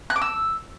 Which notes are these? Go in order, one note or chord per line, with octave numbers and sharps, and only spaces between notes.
F#6
D6
E6